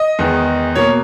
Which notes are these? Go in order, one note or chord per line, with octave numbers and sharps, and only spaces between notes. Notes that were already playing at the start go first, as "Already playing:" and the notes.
Already playing: D#5
E2 D#3 G#3 B3
B2 A#3 C#5